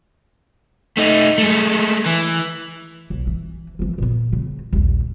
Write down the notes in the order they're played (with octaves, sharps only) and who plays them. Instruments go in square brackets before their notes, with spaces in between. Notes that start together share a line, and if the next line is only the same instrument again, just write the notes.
[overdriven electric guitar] A3 D#4
G#3 A3
E3
[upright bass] B1
E3
E3 F3
A#2 B3
C#3
A#1 D#2